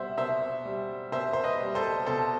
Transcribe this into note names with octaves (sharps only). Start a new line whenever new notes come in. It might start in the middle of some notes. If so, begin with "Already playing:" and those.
Already playing: B2 G3 C5 E5 F#5
B2 C5 E5
G3
B2 C5 E5
C5
B4 D#5
G3
A4 C5
B2 A4 C5